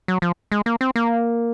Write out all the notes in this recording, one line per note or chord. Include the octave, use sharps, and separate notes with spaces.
F#3
F3
G#3
A#3
C4
A#3